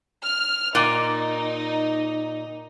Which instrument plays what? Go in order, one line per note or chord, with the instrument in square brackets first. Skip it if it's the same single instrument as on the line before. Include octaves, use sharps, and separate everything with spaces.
[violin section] F6
[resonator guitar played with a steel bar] A#2 [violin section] D#4